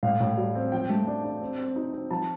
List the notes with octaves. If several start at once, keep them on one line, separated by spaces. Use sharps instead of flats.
A2 F5
A2
G3
C4
F3 G5
A3
D4
D4
C4
C4
D#4
C4
F3 A5